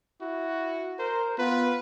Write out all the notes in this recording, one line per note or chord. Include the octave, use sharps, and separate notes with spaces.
E4 F#4
A#4 C5
B3 F4 B4